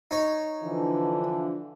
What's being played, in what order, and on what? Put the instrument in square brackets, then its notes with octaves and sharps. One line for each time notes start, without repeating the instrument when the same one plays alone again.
[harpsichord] D#4 C#5
[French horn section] D3 E3 F3